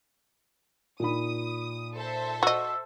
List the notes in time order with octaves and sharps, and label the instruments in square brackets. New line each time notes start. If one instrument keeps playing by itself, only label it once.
[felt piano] A#2 D#4 B5 [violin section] D#6
[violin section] A4 C5 E5
[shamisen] F#4 D#5 [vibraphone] E6